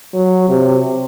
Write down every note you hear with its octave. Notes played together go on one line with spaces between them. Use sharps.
F#3
C3